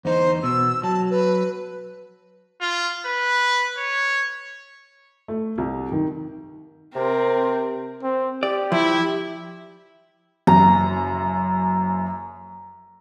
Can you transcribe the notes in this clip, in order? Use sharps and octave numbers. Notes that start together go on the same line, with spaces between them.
E2 D#4 C5
B2 E6
F#3 A5
B4
F4
B4
C#5
A3
C2
D#3
C3 C4 A#4
C4
G4 D5
F3 E4
F#1 F#2 A#5